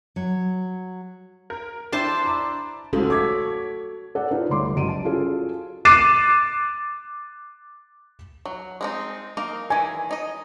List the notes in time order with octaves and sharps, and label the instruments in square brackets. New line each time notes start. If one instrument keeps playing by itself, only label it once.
[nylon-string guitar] F#3
[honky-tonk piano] A#4
[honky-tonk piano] D4 E4 [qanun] C5 A5 C6 [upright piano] G5
[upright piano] A#5 B5 D6
[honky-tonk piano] G#2 F3 [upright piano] C#3 F4 [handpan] F#4 A4
[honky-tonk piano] C#5 [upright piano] D6 G#6 B6
[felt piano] A4 D5 F#5
D#4 F4 G4 B4 C5
G1 D2 A3 C#5 C6 D6
G1 C#2 G2 F#3 D7 D#7
A5
C#4 F4 F#4 G#4 A4
D6 F#6 A6 C7 D#7 E7
[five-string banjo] F#3
G#3 C4 D#4
A#3 D#4 A#4
[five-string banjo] D#3 E3 [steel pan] G#5
[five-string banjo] D#4 D#5